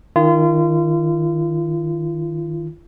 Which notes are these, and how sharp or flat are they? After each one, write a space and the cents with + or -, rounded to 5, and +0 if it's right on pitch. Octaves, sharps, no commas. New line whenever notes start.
D#3 +0 F4 -35